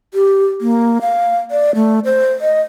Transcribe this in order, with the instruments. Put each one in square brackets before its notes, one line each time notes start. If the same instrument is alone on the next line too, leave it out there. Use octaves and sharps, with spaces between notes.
[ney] G4
A#3
F5
D5
A3
C5
D#5